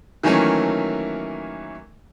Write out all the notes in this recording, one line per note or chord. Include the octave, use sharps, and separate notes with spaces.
D#3 E3 F#3 A3 A#3 C#4